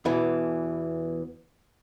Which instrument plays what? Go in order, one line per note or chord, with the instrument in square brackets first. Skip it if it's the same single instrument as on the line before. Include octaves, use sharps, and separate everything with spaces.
[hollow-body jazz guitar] E2 B2 E3